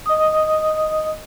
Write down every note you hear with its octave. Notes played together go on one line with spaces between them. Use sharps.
D#5 D#6